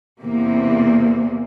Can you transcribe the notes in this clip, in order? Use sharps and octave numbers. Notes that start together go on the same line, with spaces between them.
E2 C3 A#3